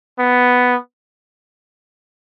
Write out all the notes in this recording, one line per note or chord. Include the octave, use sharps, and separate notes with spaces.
B3